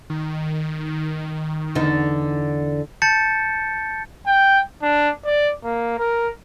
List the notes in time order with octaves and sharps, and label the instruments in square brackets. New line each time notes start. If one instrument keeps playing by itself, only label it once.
[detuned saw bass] D#3
[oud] E2 D3 D#4
[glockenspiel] A5 G6 A6 C#7
[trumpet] G5
D4
D5
A#3
A#4